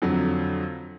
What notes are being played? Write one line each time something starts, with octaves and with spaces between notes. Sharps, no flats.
F2 D3 F#3